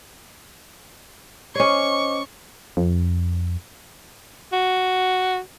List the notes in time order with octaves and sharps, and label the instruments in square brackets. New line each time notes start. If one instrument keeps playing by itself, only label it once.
[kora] C#4 C#5 [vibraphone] C5 D#5 D6 [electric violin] C#6
[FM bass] F2
[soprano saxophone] F#4